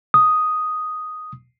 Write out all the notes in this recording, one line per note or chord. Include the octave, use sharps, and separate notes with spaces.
D#6